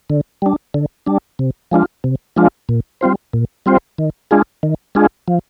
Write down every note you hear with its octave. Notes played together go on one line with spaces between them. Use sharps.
D3
G3 D4
D3
G3 D4
C3
F3 G#3 D4 F4
C3
F3 G#3 D4 F4
A#2
G3 C4 F4 C5
A#2
G3 C4 F4 C5
D#3
G#3 D4 F4 G#4
D#3
G#3 D4 F4 G#4
F3